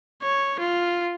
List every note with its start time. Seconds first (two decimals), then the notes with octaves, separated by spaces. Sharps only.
0.23 C#5
0.60 F4